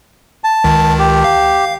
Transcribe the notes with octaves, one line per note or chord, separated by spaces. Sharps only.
A5
C#2 D#3
G4
F5